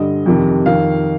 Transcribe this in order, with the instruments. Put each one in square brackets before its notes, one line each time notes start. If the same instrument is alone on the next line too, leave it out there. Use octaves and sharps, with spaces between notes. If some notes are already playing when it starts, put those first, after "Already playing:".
Already playing: [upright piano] G2 D3 D#5
F2 C3 D#3
F2 D#3 F5